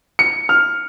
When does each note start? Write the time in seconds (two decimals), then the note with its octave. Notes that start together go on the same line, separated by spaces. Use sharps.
0.19 C#7
0.49 F6